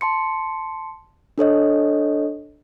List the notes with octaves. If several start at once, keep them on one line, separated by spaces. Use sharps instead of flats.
A5 C6 C#7
D4 A4 C#5 D#5